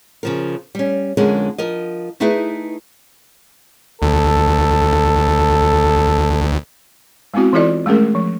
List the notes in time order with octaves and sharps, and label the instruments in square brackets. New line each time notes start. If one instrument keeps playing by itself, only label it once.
[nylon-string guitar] C#3 F3 A#4
G3 C#4
F2 D3 G#3 C#4 G#4 A#4
F3 A#4 D#5
A3 D#4 E4 G#4 B4 E5
[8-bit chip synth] D2 [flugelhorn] A4
[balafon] G#3 B3 C4 E4 F#4
E3 E4 F4 A4 D5 D#5
G#3 A3 C#4 G#4 A#4
F3